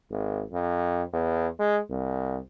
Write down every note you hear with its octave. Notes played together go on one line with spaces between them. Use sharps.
G#1
F2
E2
G#3
C2